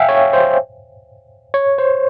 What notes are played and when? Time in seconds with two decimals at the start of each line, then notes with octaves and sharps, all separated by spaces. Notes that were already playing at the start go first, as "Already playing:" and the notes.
Already playing: E5 F5 G5 G#5
0.09 C#5
0.33 C5
1.54 C#5
1.78 C5